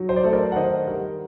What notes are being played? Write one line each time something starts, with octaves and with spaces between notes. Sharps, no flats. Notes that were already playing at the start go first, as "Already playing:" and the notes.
Already playing: F#3 D#4
C5
D5
A3 A4 C5
A#4 D5
F#5
D#3 C5 D#5
G3 A#4